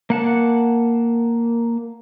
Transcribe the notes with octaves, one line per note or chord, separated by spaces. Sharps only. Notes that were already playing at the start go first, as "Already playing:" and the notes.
A#3 F#5 A5